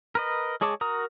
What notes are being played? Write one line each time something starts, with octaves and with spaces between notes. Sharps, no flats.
A#4 B4 D#5
G#3 G#4 C#5 A5 D6
F#4 A#4 A#5 D#6